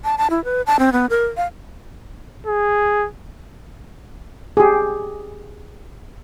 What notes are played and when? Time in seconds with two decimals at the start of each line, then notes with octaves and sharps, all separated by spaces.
0.04 A5
0.18 A5
0.30 E4
0.44 B4
0.67 A5
0.79 C4
0.93 B3
1.10 A#4
1.37 F5
2.47 G#4
4.57 G4 G#4